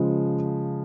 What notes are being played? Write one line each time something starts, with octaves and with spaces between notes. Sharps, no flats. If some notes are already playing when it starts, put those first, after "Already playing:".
Already playing: C#3 F3 G#3